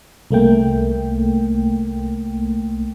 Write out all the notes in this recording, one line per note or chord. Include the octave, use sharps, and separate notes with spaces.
C2 A3 A#3 G5